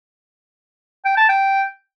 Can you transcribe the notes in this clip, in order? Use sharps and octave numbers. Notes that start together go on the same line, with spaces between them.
G5
A5
G5